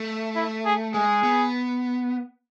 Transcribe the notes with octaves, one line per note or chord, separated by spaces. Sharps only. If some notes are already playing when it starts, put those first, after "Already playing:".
Already playing: A3
E4
G#4
G#3 G#4
B3